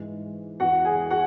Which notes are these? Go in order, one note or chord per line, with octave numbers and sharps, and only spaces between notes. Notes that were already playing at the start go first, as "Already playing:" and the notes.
Already playing: G#2 E3
E2 E3 F#4 F#5
G#4 G#5
F#4 F#5